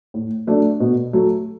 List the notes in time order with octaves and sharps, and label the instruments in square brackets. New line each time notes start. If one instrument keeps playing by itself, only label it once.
[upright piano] A2
F#3 A3 D4
B2
F#3 A3